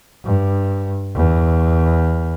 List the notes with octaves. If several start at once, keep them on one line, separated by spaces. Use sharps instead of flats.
G2
E2